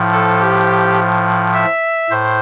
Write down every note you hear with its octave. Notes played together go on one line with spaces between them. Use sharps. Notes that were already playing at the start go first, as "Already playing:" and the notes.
Already playing: A2 F3
A4
G4
E5
A2 C5